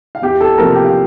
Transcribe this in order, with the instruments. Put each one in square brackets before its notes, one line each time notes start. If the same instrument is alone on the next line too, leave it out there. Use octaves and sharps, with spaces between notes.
[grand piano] F5
E2 G4 G5
A4 A5
C3 F3 A#3 A#4 A#5
G4 G5
F5